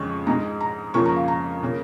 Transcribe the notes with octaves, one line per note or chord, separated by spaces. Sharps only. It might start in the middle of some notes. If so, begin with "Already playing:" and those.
Already playing: F2 C#3 G#3 C#6
G#2 G#3 A#5
A#5
F2 C#3 F3 A#3 C#6
A#5
F5
A#5
C#3 A#3